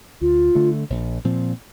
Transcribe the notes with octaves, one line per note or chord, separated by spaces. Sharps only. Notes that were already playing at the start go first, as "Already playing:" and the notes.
D2 F4
D3 A3
A#1
A#2 F3 C4